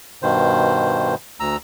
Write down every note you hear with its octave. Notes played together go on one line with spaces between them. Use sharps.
G2 B2 D#3 C5
D2 A#5 E6